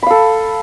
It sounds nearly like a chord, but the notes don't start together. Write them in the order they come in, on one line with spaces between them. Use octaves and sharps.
B5 F5 A4